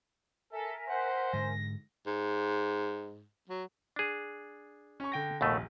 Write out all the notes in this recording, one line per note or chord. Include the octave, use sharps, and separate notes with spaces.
A4 A#4 E5 G#5
C5 F#5
G#2 D3 G#3 A#6
G#2
F#3
D4 G#4
C#4 C#6
D3 G5 A#6
D#1 A#1 D#2 B2 A3